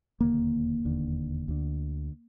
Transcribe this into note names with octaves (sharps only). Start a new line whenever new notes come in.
E1 D#2 D3 A#3
E1 D#2 D3
D2 D3